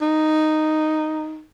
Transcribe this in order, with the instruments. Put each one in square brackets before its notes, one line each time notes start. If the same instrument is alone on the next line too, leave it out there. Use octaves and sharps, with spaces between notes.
[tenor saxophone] D#4